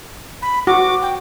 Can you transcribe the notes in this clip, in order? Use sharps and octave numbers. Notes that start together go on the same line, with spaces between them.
B5
F#4 D6
G5